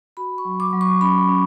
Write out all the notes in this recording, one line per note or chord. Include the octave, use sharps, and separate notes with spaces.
F#4 B5
C#6
F#3
D6
F#3
C#6
C#4 B5
C#4